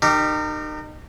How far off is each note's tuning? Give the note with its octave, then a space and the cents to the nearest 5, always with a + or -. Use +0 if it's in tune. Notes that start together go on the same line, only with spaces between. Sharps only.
D#4 -35 G4 -5 A#4 -25